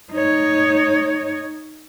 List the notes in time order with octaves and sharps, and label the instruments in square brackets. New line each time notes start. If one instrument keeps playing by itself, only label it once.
[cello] D#4 C#5